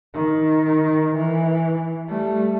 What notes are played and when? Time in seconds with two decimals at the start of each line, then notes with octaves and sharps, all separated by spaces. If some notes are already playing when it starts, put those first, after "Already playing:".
0.15 D#3
1.16 E3
2.09 G3 A3